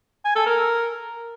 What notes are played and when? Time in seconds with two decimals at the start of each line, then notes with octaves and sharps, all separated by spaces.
0.25 G#5
0.35 A4
0.46 A#4